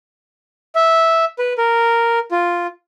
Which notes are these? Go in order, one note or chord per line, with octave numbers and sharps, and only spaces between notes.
E5
B4
A#4
F4